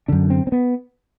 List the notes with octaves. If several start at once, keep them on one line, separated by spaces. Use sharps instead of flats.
F#2 D3 D4
C4
C4
B3